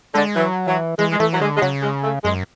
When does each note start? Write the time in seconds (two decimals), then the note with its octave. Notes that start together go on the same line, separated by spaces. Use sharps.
0.15 D3 G#3
0.36 E3 F#3
0.67 E3 F#3
0.99 E3 G#3
1.12 G#3
1.20 E3 A3
1.34 F#3
1.40 D3 G#3
1.57 G#3
1.62 C#3 F#3
1.83 G#3
2.04 A3
2.24 F#2 G#3